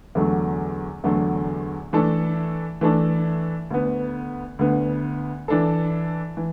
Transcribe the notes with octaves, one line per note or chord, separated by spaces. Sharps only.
E2 D3 F#3 A3
E2 D3 F#3 A3
E3 A3 D4 A4
E3 A3 D4 A4
D2 D3 B3
D2 D3 B3
E3 D4 A4
E3